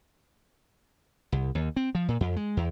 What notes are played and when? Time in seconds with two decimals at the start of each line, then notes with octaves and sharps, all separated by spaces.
1.32 C2
1.55 D#2
1.76 C4
1.95 F3
2.08 A#2
2.21 F2
2.36 G#3
2.57 E2